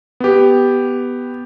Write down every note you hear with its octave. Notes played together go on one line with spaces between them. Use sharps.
B3 G4